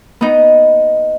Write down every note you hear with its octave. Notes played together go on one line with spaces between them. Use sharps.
B3 D#4